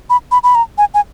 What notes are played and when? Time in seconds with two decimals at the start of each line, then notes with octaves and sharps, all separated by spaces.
0.10 B5
0.31 B5
0.43 B5
0.55 A#5
0.78 G#5
0.94 G#5